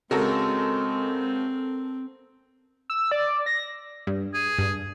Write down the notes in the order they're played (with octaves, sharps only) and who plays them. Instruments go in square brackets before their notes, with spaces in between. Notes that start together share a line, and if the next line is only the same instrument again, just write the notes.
[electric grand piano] C#3 F#4 [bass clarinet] G#3 [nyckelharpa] C4 [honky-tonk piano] A4 A#4
[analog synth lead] E6
D5
A#6
[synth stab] G2
[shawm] G#4
[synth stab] G2